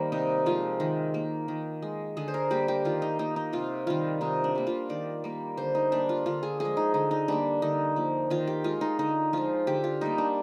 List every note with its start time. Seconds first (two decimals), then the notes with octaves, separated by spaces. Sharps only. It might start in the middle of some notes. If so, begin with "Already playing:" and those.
Already playing: D#3 G3 A#3 A#4 C5
0.12 C3 D#4
0.46 F3 G#3 F4
0.80 D#3
1.14 A#3
1.48 D#3
1.82 G#3
2.17 D3 G#4
2.28 C5
2.34 A#4
2.50 G3 A#3 G4
2.68 G4
2.85 D#3 F4
3.02 D#4
3.19 A#3 D#4
3.36 D#4
3.53 C3 F4
3.87 D#3 G3 F4
4.21 C3 D#4
4.44 D4
4.55 G3 A#3
4.67 F4
4.89 D#3 D5
5.24 G3 A#3
5.57 D3 C5
5.75 D#4
5.92 G3 A#3 D4
6.09 F4
6.26 D3 F4
6.43 G#4
6.60 F3 G#3 G#4
6.77 D#4
6.94 D3 D#4
7.11 D#4
7.28 G3 A#3 D4
7.62 D3 D#4
7.96 F3 A#3
8.30 D#3 F4
8.47 G4
8.64 G#3 F4
8.81 D#4
8.99 D3 D#4
9.33 F3 G#3 F4
9.67 D3 G4
9.84 F4
10.01 G3 A#3 D#4
10.18 D4